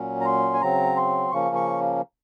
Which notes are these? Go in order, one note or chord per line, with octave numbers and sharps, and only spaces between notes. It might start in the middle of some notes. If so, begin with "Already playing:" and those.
Already playing: A#2 F#3 C#4
A#5
C6
G#5
C#3 F#3 C4 A#5
C6
C#3 F3 A#3 C#4 C#6
C#6